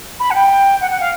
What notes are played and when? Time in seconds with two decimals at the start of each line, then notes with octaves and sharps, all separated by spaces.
0.20 B5
0.30 F#5
0.35 G5
0.81 F#5
0.91 F#5
1.00 F5